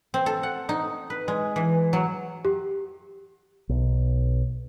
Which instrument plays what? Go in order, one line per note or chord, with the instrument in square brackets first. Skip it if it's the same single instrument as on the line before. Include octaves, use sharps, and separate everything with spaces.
[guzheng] C4
A4
F#5
D#4
B4
G#3
E3
F#3
[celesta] G4
[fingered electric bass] B1